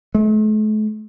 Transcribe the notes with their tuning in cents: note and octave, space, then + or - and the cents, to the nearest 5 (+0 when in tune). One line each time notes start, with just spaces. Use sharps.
A3 -45